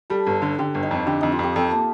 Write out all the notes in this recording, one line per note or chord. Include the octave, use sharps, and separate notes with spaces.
G3 A4
G1
D3
D3 G4
G1
D#4
F2
D3 G4
F2 D#4
F4
F2 G4
F2 A4
A#3